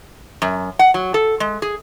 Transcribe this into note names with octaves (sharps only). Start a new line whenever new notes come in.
F#2
F#5
F#3
A4
G#3
G#4